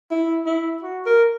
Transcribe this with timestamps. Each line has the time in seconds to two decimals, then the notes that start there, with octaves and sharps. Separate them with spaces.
0.11 E4
0.46 E4
0.83 F#4
1.06 A#4